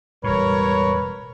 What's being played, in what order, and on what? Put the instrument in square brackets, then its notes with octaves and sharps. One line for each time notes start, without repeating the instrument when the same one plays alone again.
[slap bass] E1 A2 [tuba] G3 [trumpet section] A#4 C#5 [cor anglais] B4